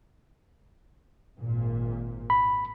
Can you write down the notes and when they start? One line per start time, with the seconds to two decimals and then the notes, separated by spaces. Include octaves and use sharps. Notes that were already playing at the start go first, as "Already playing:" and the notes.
1.37 G#1 A#2
2.30 B5